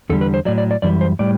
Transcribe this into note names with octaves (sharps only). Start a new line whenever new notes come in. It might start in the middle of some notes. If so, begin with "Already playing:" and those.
E2 D3 G3 A4
B4
C5
A2 F#3 D5
D5
D5
F#2 E3 G3 D5
C5
A2 G3 D5